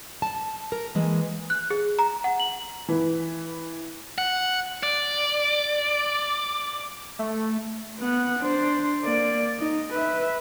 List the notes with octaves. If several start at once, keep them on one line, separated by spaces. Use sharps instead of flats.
A5
A#4
E3 G#3 A#3
F#6
G#4
A#5
F#5
F#7
E3 B4
F#5
D5
A3
B3 F#5
D4 C5
A#3 D5
D#4
B4 E5